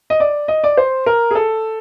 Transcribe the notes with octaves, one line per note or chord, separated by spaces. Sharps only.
D#5
D5
D#5
D5
C5
A#4
G#4
A4